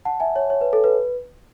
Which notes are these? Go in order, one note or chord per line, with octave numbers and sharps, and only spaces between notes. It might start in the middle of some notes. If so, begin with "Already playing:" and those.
F#5 A5
E5 G#5
C#5
C#5
B4
A4
B4